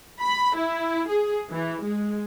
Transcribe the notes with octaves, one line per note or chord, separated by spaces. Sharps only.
B5
E4
G#4
E3
G#3